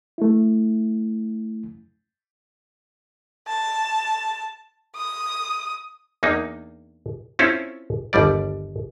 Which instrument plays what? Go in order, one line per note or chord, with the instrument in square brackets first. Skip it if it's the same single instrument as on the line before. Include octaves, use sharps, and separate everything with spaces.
[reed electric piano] A3 E4
[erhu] A5
D#6
[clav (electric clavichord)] E2 A#3 D4 D#4
C4 C#4 E4 F4 A4 C#5
G1 D#2 G3 D5